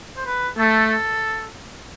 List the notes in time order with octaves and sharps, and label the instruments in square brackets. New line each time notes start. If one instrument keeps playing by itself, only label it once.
[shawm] C5
B4
[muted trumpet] A3 [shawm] A4